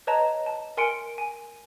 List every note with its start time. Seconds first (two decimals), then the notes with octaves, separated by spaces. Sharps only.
0.07 B4 C#5 D#5 A5 A#5
0.46 A5
0.77 A#4 G#5 C6 C#7 D7
1.18 G#5